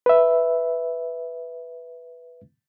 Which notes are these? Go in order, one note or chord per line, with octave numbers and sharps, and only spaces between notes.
B4 E5